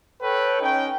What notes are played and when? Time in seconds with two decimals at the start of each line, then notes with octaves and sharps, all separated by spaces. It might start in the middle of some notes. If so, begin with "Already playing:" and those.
0.22 A4 B4 C#5 G5
0.61 C#4 D#4 G5